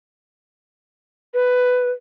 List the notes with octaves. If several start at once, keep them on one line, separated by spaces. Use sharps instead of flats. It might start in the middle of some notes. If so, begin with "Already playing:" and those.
B4